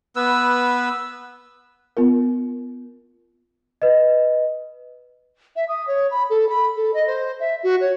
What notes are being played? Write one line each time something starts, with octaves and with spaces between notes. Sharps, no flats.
B3 B4 E6
B3 F4 A#4
B4 D#5
E5
D#6
C#5
B5
A4
B5
A4
D#5
C5
E5
F#4
C#5